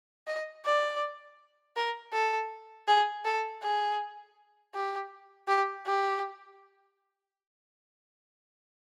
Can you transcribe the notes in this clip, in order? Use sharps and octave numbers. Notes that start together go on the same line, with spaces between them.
D#5
D5
A#4
A4
G#4
A4
G#4
G4
G4
G4